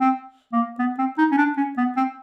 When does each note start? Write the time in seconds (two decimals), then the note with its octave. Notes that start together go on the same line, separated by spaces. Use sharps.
0.01 C4
0.53 A#3
0.79 B3
0.98 C4
1.18 D#4
1.31 C#4
1.37 D4
1.57 C#4
1.77 B3
1.97 C4